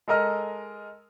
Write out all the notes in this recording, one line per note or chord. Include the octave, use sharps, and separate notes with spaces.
G#3 A4 A#4 D#5 F6